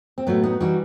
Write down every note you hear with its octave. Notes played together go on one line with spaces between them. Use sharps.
C4
A2 F#3 A3 B3
B3 D#4
E3 G3 D#4 F#4